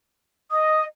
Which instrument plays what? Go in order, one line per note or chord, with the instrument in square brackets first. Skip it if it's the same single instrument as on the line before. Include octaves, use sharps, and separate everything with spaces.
[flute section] D#5 [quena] D#6